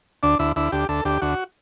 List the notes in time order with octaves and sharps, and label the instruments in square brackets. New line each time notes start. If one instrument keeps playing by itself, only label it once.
[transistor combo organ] D2 D4
D2 E4
D2 E4
D2 G4
D2 A4
D2 G4
D2 F#4